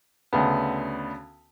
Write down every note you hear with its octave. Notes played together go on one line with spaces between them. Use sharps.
D2 C#3 B3